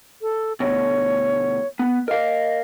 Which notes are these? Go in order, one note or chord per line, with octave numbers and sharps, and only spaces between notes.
A4
D2 B2 C#5
B3
A#4 D#5 F5